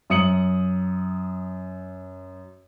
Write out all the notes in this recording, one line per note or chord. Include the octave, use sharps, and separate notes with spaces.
F#2 D#6 C#7 F#7